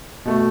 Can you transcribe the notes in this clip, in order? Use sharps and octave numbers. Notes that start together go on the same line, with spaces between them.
B2 A3